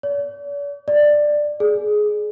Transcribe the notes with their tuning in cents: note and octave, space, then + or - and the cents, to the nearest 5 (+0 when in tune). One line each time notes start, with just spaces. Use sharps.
D5 -45
D5 +10
G#4 +15